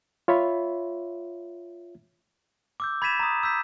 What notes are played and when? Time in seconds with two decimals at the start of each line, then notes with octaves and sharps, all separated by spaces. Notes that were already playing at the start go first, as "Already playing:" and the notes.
0.28 F4 C#5 E5 B5
2.80 D6 E6 G6
3.02 B5 G#6 A6 B6 D#7 E7
3.19 A#5 D#6
3.43 E6 G6 B6